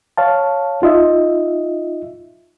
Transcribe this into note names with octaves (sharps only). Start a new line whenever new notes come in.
C#5 F5 A5
D#4 F4 D#5 E5